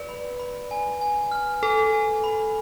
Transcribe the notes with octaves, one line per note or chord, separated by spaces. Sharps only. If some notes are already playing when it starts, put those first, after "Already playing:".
Already playing: B4 D5 C#7
B5
B5
G#5
G#5
F6
A4 G#5
G#5
B5